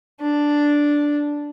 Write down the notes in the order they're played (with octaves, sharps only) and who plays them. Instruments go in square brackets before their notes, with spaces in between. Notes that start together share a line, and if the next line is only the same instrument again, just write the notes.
[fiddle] D4